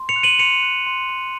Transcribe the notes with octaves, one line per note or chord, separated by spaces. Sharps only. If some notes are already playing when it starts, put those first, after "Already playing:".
Already playing: C6
C#7 F7
F#6
D#7 F#7
C6 C#7 F7
F#6
C6
C6